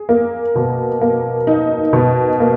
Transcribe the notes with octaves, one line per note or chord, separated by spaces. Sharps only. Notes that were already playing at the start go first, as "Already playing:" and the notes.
Already playing: G#4
A#3
B2
A#3
D#4
B2
A#3